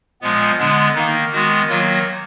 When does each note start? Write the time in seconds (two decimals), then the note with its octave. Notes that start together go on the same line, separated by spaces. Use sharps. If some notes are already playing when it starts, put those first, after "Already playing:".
0.21 A#2 F3 G#3 B3
0.58 D3 G#3 B3 D4
0.95 D#3 A#3 D#4
1.32 D#3 G#3 B3 F#4
1.69 D#3 F#3 A#3 F4